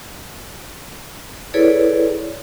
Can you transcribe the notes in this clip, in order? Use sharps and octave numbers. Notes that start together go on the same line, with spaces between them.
E4 G#4 A4 B4 C#5 D5